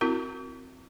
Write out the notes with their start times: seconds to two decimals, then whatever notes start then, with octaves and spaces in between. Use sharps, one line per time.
0.01 C4 E4 F#4 A#4